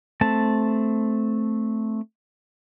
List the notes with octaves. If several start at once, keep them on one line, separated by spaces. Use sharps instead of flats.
A3 C4 A5